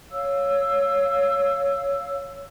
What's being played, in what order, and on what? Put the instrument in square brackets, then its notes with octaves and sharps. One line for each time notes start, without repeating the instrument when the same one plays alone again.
[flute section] C#5 F5 E6